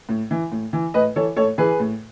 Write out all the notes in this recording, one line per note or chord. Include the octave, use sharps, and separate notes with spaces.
A2
E3
A2
E3
A2 B4 D#5
E3 A4 C#5
A2 A4 C#5
E3 G#4 B4
A2